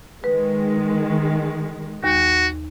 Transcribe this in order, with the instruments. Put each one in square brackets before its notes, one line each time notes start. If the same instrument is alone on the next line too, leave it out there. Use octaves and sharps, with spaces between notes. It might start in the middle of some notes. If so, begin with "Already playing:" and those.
[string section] D#3 G#3 [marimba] B4
[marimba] D#2 [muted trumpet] F#4